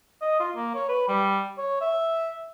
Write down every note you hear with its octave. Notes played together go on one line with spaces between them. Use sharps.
D#5
F4
A#3
C#5
B4
G3
C#5
E5